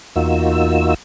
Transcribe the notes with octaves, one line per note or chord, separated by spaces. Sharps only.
E2 A#3 D#4 F4 F#4 E6